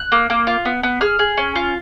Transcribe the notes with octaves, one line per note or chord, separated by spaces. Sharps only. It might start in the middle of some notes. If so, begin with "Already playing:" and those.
Already playing: F#6
A#3
A#3
F4
B3
B3
G#4 F6
G#4
C#4
F4